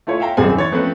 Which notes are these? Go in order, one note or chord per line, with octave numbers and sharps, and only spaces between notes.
A3 E4 F4 C#5
E5 F5 G5 A#5
D#1 F#2 G3 G#3 C4 G#5
E3 C#5 A6
F3 A3 C4 C#4 B4